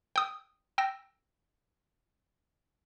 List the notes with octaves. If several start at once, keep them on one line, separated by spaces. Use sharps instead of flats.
G5 D#6
G5 E6 A#6